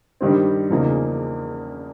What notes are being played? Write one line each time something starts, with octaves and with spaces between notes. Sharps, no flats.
G2 D#3 G3 C4
E2 C#3 F3 A#3 D#4